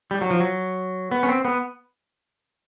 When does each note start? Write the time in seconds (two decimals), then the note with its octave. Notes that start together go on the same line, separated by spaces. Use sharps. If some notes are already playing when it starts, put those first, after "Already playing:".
0.11 G3
0.21 F#3
0.30 F3
0.40 F#3
1.11 B3
1.23 C#4
1.29 C4
1.45 B3